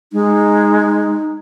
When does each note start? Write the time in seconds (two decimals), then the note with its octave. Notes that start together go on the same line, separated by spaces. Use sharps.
0.13 G#3 D#4